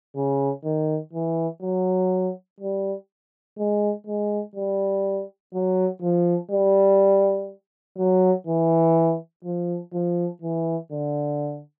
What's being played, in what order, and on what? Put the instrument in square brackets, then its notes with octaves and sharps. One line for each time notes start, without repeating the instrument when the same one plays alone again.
[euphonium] C#3
D#3
E3
F#3
G3
G#3
G#3
G3
F#3
F3
G3
F#3
E3
F3
F3
E3
D3